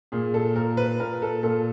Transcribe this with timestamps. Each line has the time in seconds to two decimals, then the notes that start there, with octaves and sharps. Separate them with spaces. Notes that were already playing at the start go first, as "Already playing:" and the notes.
0.12 A#2 G#4
0.34 A4
0.56 A#2 A#4
0.77 B4
1.00 A#2 A#4
1.22 A4
1.43 A#2 A4